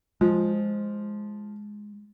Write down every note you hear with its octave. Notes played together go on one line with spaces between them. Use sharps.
F3 G#3